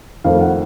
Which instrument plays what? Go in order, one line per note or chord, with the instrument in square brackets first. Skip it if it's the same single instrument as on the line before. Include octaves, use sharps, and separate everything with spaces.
[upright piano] F2 D#3 A3 F5
F#5